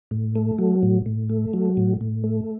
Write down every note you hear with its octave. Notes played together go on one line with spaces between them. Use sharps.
A2
A3
F#3
A2
A2
A3
F#3
A2
A2
A3